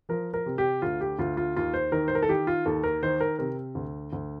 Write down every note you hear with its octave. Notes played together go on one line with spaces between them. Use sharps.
F3 A#4
A#4
C3
G4
D2 F4
G4
D2 F4
F4
D#2 F4
C5
D#3 A#4
C5
A#4
A4
D#3 G4
F4
D#2 A4
A#4
D#3 C5
A#4
C3 A#4
D2
D2